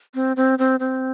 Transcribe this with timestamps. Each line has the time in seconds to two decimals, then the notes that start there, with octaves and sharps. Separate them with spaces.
0.15 C4
0.37 C4
0.59 C4
0.80 C4